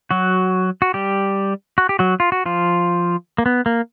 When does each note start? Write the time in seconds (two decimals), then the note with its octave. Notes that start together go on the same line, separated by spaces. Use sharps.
0.11 F#3 F#4
0.82 F#4
0.94 G3 G4
1.78 F#4
1.89 G4
1.99 F#3 F#4
2.20 F4
2.32 F#4
2.46 F3 F4
3.38 A#3
3.46 B3
3.66 A#3